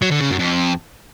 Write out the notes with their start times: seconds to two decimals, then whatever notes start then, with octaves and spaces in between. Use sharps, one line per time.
0.02 F#3
0.11 D3
0.21 C#3
0.30 F#2
0.39 F2